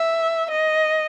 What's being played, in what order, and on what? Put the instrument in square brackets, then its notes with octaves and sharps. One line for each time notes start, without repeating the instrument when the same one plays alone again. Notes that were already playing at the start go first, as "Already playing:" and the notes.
Already playing: [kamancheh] E5
D#5